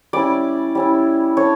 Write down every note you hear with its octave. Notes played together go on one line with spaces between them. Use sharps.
G3 C#4 E4 D5
G3 C#4 E4
A3 D4 C#5